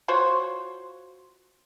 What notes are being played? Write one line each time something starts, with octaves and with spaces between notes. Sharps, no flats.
F4 F#4 C5 C#5